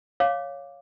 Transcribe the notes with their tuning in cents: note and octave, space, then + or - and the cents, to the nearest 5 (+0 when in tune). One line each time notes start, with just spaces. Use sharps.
C#5 +0 F5 +5 D6 +0